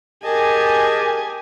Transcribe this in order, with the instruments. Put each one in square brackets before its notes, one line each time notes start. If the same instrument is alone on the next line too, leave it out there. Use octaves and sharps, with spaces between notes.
[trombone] G4 [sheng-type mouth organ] G#4 D#5 A5 [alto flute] A#4 [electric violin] G#5